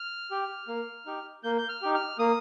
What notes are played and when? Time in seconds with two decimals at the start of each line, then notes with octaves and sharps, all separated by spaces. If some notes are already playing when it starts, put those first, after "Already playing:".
Already playing: F6
0.31 G4
0.68 A#3
1.06 D#4 G4
1.43 A#3 G6
1.58 G6
1.69 F6
1.82 D#4 G4
1.94 F6
2.19 A#3 D#6